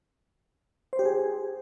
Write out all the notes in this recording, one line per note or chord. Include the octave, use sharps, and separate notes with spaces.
C5
G4
G#4